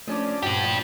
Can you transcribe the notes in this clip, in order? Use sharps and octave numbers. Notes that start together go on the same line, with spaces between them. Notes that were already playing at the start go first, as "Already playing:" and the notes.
F3 A3 C#4 D4
G2 A#2 F3 D4 F#4 G4
F3